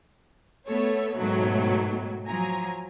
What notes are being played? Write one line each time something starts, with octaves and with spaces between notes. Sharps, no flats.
A3 B3 A4 C#5
G#2 B2 D#3 F#3 A3
F3 F#3 G#5 A#5